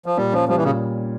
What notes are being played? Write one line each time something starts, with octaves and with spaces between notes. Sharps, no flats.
F3
A#2 G3
F3 C#4
F3 G3
E3
A#2 C#3